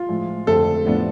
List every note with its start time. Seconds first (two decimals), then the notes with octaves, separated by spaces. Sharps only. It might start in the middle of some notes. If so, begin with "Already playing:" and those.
Already playing: F4
0.09 A2 F3 G#3
0.47 F2 D3 A3 C4 A4
0.85 A2 F3 B3 D4